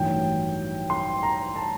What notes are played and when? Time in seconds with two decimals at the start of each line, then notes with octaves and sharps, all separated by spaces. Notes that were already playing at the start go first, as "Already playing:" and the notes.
Already playing: A1 G2 D#3 F#3 G5
0.90 C6
1.23 A#5
1.56 A5